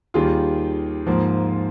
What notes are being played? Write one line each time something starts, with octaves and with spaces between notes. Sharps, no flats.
D#2 D#3 G3 F4 G#4
G#2 F3 A#3